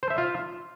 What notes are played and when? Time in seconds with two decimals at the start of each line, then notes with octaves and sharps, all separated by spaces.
0.03 C5
0.10 E5
0.18 F4